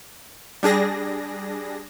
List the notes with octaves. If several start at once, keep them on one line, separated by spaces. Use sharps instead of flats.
G3 D4 G#4 A#6